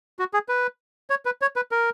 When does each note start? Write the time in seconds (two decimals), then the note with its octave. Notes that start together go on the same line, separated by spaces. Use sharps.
0.19 F#4
0.34 G#4
0.49 B4
1.10 C#5
1.25 B4
1.42 C#5
1.56 B4
1.71 A#4